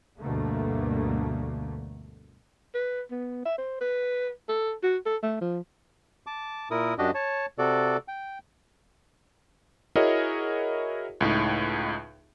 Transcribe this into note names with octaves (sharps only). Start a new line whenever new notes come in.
D2 G2 B2 D3 A3 A#3
B4
B3
E5
C5
B4
A4
F#4
A4
A3
F3
A5 D6
A#2 E4 A#4 D#6
F#2 D4 F#4 G4 D#5
C#5 A5
C3 F#4 A4 D5
G5
E4 F#4 G#4 A#4 C#5 D#5
C#2 A2 D#4